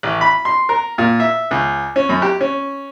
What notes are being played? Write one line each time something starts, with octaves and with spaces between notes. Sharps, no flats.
A1
B5
C6
A#4
A#2
E5
C#2
C#4
F#2
G4
C#4